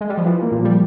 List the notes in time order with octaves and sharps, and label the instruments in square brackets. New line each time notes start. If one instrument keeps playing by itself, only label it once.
[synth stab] G#3
G3
F3
[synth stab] E3 [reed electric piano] F4
[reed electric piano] A#3
[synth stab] A#2
[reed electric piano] F3 [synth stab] G3